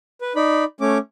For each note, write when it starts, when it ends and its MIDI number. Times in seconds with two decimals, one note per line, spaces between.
0.21 0.33 71
0.36 0.64 63
0.36 0.64 74
0.36 0.64 83
0.81 0.98 57
0.81 0.98 61
0.81 0.98 86